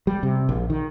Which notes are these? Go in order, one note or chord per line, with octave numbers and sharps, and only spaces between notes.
G3
C3
A#1
D#3